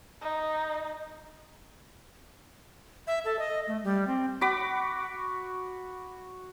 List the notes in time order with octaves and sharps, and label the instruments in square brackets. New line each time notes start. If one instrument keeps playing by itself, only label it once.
[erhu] D#4
[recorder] E5
A4
D#5
A3
G3
C4
[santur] F#4 B5 D6